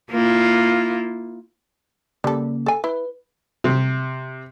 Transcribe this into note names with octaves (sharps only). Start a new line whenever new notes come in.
A#3 E4 F4
C#3 G3 A#3 A4
A4 G#5
E4 B4
C3